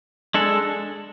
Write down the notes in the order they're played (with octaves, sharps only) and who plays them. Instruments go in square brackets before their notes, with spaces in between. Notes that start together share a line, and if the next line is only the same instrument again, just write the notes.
[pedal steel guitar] G#3 D4 A4